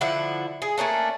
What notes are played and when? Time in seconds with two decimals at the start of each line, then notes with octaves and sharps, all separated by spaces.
0.01 D3 F3 E4 F#5
0.62 G#4
0.78 A3 A#3 C#4 D4